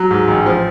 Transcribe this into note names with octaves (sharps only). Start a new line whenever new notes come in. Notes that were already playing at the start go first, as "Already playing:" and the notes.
Already playing: F#3
G#2
A1
F3